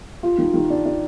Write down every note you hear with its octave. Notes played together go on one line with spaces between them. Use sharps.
F4
D#3
D#3
D4
D4